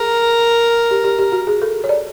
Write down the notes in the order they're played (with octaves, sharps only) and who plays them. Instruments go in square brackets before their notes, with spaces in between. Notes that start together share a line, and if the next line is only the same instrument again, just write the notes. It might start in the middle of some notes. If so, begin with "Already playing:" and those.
Already playing: [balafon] G#4 [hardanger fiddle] A#4
[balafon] G4
G4
G4
F#4
G#4
A4
C#5
D5